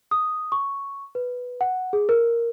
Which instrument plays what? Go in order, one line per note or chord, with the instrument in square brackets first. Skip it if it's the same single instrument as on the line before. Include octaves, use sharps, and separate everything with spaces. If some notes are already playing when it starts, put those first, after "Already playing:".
[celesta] D#6
C#6
B4
F#5
G#4
A#4